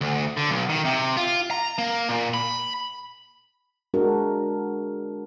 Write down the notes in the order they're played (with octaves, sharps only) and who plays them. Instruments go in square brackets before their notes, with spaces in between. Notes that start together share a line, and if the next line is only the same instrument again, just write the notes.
[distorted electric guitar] D2
D3
B1
D#3
C3
F4
A#5
A#3
A#2
B5
[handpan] G#3 D4 F#4 A#4